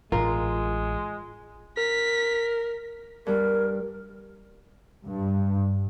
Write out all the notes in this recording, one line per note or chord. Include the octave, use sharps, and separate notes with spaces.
A1 G#3 F4 A#4
A#4 B6
G2 G3 A#4
G2